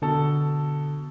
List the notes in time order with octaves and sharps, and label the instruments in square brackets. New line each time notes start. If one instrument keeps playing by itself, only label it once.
[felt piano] B2 A4 [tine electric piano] D3